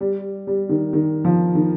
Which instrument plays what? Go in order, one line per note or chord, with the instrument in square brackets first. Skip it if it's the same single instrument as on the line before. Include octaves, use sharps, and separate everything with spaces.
[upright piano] G3
G3
D#3
D#3
F3
D#3